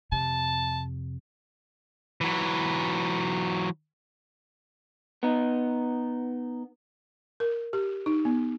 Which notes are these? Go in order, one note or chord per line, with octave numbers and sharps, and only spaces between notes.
F2 C3 A5
E3 F#3
B3 D#4
A#4
G4
D#4
B3